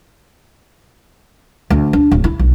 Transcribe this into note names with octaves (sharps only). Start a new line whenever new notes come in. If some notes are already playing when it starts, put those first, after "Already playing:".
D2
D4
D1
E4
B1